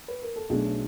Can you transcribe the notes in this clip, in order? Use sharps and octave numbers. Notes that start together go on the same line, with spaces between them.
B4
A#4
A4
B1 B2 F#3 A3 D4 G#4